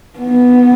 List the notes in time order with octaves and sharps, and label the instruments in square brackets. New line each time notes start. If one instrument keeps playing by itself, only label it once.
[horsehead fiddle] B3